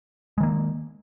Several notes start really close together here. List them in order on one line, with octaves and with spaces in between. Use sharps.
G#3 D#3 A#3